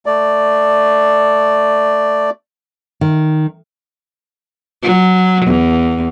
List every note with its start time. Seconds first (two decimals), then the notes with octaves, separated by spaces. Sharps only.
0.06 A3 D5
3.01 D#3
4.83 F#3
5.46 E2